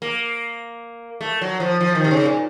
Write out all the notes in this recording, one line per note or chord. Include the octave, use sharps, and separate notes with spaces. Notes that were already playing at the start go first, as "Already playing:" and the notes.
A#3
A3
F#3
F3
F3
D#3
C3
C#3
A#2